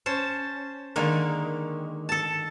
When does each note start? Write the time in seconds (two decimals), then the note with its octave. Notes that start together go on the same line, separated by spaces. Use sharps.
0.06 C#4 C5 A5
0.96 D3 D#3 G#3 A#3
2.09 A4 A5